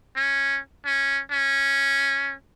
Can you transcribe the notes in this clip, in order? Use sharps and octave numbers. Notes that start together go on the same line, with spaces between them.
C#4
C#4
C#4